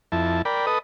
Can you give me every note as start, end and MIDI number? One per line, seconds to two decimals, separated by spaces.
0.12 0.42 41
0.12 0.42 64
0.12 0.42 81
0.45 0.66 70
0.45 0.66 74
0.45 0.66 79
0.45 0.66 83
0.67 0.79 69
0.67 0.79 71
0.67 0.79 75
0.67 0.79 87